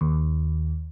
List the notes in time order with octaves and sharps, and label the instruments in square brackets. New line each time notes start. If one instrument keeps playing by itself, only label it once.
[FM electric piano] D#2